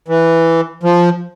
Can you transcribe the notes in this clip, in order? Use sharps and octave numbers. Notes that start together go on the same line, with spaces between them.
E3
F3